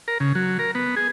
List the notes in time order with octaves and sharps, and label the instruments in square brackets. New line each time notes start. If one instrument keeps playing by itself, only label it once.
[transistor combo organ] A#4
C#3
F#3
A#4
B3
G#4